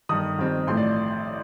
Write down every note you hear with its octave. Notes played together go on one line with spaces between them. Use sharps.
G1 G2 D#3 D#6
F2 D#3 G3 C4
A1 A2 F3 A3 C6
D5